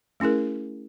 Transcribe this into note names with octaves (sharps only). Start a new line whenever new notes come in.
A3 C#4 E4 G#4 A#4